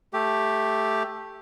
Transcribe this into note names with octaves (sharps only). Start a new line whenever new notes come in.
A3 G4